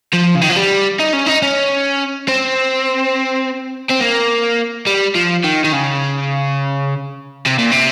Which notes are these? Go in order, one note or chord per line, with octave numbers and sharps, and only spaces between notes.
F3
C#3
D#3
F3
G3
D#4
C#4
D#4
C#4
C4
C4
A#3
G3
F3
D#3
D#3
C#3
C3
A#2
C3